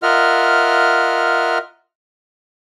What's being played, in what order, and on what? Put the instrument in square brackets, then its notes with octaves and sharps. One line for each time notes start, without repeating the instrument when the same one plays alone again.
[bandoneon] F4 A#4 D#5 E5 F#5 F6